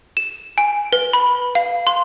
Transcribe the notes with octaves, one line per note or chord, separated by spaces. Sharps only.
E7
G#5
B4
B5
F5
C6